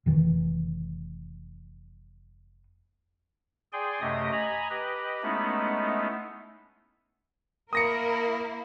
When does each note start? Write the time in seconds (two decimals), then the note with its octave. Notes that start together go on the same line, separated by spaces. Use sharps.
0.06 F1 D#3 E3
3.73 G#4 D5 G5 G#5 C6
4.01 F#2 C3 A3 G4 D#5 D#6
4.32 D#5 G#5 A#5 B5
4.70 G4 B4 D#5
5.23 G#3 A3 B3 C#4 D#4 E4
7.73 A#3 E4 A#4 D#6 A#6 C#7